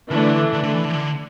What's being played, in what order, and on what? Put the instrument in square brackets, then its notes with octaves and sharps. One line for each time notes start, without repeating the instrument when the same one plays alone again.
[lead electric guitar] D3 [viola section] E3 A3 D4
[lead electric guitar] D3
D3
E3
D3
E3
D3